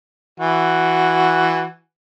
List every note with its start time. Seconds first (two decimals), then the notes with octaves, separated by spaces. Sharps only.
0.40 E3 F#4